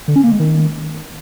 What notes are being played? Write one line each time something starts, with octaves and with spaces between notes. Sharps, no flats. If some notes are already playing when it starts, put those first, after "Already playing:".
D3
C#4
A#3
G#3
D#3